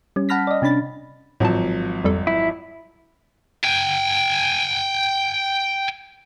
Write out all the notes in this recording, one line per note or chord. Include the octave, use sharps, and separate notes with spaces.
G3 C#4
F#5 A5 B5 F6 A#6 B6
D5 D#5
C3 C#4 D4 B5 A6
G#1 A2 F3 F#3 A5
F2 G3 A4
E4
G5 G#5